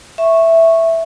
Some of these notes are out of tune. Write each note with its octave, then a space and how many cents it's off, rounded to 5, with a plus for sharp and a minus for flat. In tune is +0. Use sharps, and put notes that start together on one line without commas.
E5 +0 C#6 -10